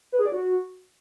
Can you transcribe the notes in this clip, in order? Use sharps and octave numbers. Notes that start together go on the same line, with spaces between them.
B4
G#4
D5
F#4